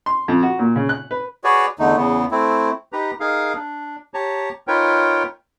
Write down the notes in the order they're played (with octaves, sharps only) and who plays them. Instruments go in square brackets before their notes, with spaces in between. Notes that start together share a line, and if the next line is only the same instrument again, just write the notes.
[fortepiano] C6
F2
F#4
A#2
C#3
F#6
B4
[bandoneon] F#4 G#4 B4 C#5 D5
E2 D3 A3 D#4
E2 C#3 B3
A3 C4 E4
[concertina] D#4 G4 B4 A#5
D#4 G#4 A#4 F5
D4
G4 C#5 A5 A#5
D#4 F4 A#4 B4 C#5 G5